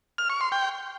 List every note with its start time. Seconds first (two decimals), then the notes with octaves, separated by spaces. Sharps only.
0.18 F6
0.30 C#6
0.41 C6
0.52 G5